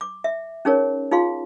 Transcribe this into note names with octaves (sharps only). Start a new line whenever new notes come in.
D6
E5
C#4 D#4 G#4 A#4 C#5
D#4 F4 G#4 F5 C6